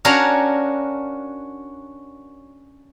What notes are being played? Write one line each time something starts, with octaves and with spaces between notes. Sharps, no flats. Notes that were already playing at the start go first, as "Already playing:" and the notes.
C#4 D4 F#4 A#4 C#5 F5